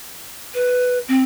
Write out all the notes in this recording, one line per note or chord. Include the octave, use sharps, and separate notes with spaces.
B4
C4